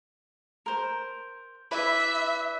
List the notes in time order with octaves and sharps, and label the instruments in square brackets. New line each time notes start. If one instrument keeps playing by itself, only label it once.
[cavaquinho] A#4 C5
[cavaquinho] E4 B4 D5 [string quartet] E5